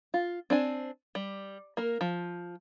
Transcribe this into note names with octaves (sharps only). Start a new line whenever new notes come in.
F4
C4 D4 G#5
G3
A#3 A#4
F3